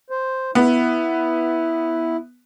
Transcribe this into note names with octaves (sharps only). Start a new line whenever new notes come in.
C5
B3 E4